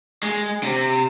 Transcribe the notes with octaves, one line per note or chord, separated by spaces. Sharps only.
G#3
C3